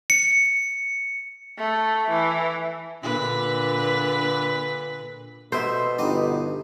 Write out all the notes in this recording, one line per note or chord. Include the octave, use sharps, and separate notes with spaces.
C#7
A3
E3
A#2 D3 B4
B2 B3 A4 C5 E5
G1 B3 D#4 G4